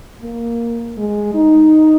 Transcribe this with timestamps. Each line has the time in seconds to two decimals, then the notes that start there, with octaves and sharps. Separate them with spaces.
0.22 A#3
0.97 G#3
1.35 D#4